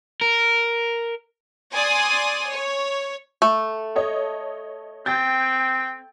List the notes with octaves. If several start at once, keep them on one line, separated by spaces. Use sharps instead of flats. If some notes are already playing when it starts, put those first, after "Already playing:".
A#4
D5 G#5 C6 D#6
C#5
A3
A4 C#5 D#5
C4 G5 G6 A6